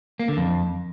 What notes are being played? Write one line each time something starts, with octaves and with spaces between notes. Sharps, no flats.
A#3
D3
F2